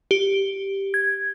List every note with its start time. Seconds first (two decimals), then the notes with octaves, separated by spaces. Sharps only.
0.11 G4
0.94 G#6